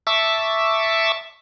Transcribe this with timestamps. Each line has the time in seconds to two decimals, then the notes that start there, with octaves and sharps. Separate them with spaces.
0.07 E5 A5 C#6 D6 E6